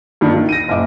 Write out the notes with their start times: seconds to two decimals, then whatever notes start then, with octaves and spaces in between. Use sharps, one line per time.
0.21 G2 D#3 D4
0.34 D#3
0.49 A#6 D#7
0.68 F#1 A#2 E5 D6